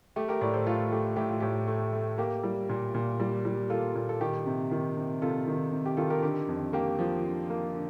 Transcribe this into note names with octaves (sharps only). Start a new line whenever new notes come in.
A3 G4
G4 A#4
A2 A#4 D5
A4 C5
A3 F4 A4
A3 G4
A2 G4
F4
A2 G4
A3
A3
A#3 G4
G3
A#2
A#2
G3
G3
A#3 F4 A4
A#2
A4
D#3 G4
C3
D#3
C3
C3 F4 A4
D#3
C3
G4
D#3 F4 A4
G4 A#4
D3 G4
F2
A#3 G4
F3
D3
A#3
D3